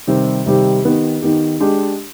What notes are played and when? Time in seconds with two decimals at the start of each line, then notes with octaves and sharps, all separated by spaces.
0.07 C3 D#3 G3 C4 G4
0.46 C3 D#3 G3 C4 G4
0.84 D#3 B3 D#4 G4
1.22 D#3 B3 D#4 G4
1.60 G#3 D4 G4